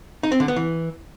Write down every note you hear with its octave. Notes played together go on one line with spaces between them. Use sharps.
D#4
C4
D3
B3
E3